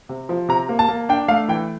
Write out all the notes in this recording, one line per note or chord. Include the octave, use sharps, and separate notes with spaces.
C3
F3
C3 A#5
A#3
A5
A#3
D4 G5
A3 F5
E3 G5